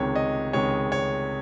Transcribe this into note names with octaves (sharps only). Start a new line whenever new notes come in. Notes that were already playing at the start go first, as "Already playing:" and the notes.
Already playing: C#2 C3 D#3 G#3 C#5
D#5
C#2 C3 D#3 G#3 C#5
C#5